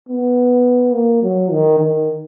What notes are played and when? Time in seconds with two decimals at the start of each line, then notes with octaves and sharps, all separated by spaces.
0.09 B3
0.93 A#3
1.23 F#3
1.51 D#3
1.79 D#3